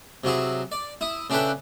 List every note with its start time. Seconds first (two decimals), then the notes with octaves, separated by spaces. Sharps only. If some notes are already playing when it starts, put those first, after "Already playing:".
0.24 C3 F#3 E4 G#4
0.72 D5
1.01 E4 D#6
1.30 C#3 D4 E4 A4 B4 G5